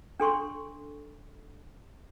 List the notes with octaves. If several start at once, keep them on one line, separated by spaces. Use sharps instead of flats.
D4 A4 C6 C#6